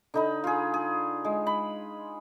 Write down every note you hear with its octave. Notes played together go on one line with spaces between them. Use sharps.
D3 D#4 B5
F4 G#4
G#4
G#3
B5